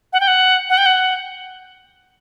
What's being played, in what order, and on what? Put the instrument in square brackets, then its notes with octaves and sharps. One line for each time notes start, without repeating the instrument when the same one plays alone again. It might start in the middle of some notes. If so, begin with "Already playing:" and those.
[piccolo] F#5
G5
F#5
F#5
G5
F#5